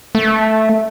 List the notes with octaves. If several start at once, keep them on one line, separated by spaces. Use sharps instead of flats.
A3